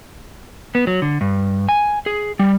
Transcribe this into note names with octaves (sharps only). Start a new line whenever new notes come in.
B3
F#3
D3
G2
G#5
G#4
G3